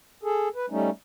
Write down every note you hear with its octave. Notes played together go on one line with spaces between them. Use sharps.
G#4 A4
B4
G3 A3 C#4 D#4